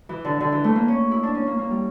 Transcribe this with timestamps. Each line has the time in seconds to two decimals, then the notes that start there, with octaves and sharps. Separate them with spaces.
0.09 E3
0.25 D3
0.40 D3
0.52 E3
0.64 A3
0.76 A#3
0.88 C#4
1.11 E4
1.23 D4
1.35 C#4
1.47 A#3
1.59 A#3
1.70 G3